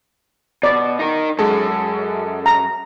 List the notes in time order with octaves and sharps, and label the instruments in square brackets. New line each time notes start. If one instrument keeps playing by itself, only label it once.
[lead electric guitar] B2 [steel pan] D5
[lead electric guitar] D#4 A#4
[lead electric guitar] F#2 [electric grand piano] G#3 G#4 A4
[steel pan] A#5